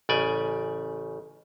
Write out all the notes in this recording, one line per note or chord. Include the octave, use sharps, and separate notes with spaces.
A1 C#3 D5 G#5